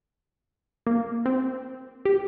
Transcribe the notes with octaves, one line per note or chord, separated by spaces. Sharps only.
A#3
C4
G4